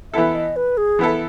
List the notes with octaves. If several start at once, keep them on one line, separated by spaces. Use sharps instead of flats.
E3 B3 E4 A4 E5
D#5
B4
G#4
E3 B3 E4 A4